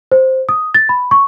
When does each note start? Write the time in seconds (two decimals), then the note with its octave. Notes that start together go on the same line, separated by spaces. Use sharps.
0.12 C5
0.49 D#6
0.74 A6
0.89 B5
1.11 C#6